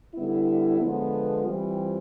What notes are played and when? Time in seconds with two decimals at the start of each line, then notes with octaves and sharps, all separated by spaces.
0.15 D3 G3 B3 E4
0.81 D3 F3 G#3 B3
1.45 E3 G3 C4 F4